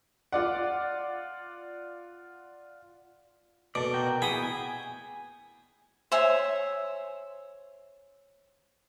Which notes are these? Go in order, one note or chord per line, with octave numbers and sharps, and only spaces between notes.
F4 D5 F#5
B2 A4 D5
F#4 A#4 G5
B3 E4 G#4 G5 D#6
G#5
C5 C#5 E5 G#5